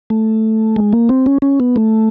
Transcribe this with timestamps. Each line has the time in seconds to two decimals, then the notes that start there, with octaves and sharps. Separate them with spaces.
0.10 A3
0.76 G#3
0.93 A#3
1.09 C4
1.26 C#4
1.42 C#4
1.60 B3
1.76 A3